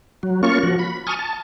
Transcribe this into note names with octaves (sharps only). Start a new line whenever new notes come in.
F#3
A#3 C#4 F4 C#6
F3 F#4
B5
G#5 A5 C#6 D#6 F6
A5